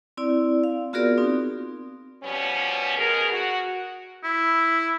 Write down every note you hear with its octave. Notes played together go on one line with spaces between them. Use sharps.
C4 E4 D5
F5
B3 F4 F#4 G#4 A#4 D5
C4 D#4
B2 F3 G3 B3 C#4
B2 G#4 A#4
F#4
E4